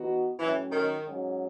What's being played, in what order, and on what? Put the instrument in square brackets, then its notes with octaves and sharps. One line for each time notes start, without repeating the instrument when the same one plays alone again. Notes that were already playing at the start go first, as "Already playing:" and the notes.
Already playing: [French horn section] E3 B3 D#4 F#4
[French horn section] A2 F#3 C#4 [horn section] E3
[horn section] D#3
[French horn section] G#2 F#3 C#4